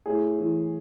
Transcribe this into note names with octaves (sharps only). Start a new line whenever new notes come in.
A2 G#4
E3